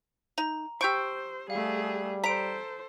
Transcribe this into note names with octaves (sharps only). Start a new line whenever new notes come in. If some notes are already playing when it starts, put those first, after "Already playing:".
D#4 A#5
G4 C5 C#6 E6 G6 D7
G3 A3 G#4 F5
A4 C5 A#5 B6 D7